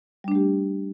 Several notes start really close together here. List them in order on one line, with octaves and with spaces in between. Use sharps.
G3 D4 A3 G4